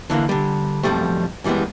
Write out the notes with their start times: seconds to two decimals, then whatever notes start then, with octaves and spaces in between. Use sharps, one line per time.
0.10 D3 E3 A3 A#3
0.29 D3 G3
0.83 B1 F2 B2 F3 G3 A3
1.44 F#2 E3 G3 G#3 B3